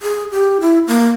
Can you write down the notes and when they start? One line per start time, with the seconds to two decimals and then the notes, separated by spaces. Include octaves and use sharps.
0.03 G#4
0.32 G4
0.61 E4
0.87 A#3